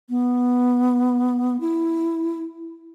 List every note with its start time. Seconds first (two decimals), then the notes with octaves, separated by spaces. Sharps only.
0.10 B3
1.61 E4